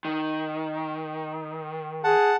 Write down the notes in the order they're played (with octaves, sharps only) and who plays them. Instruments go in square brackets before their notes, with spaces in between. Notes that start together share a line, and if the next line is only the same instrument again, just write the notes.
[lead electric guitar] D#3
[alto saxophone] G#4 [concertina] F#5 A5